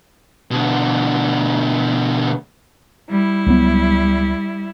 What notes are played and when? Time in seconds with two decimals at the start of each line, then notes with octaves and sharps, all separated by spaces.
0.51 B2 D3
3.09 G3 E4
3.46 C#2 F#3 B3